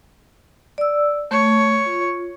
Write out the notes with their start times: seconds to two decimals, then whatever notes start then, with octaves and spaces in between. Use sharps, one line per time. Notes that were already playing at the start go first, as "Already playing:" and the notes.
0.78 D5 E6
1.31 A3 C#5
1.86 F4